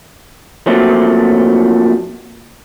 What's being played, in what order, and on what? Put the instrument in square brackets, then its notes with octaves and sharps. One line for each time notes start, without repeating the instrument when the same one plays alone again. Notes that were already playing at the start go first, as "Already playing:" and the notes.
[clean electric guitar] A#2 F3 F#3 A3 C4 C#4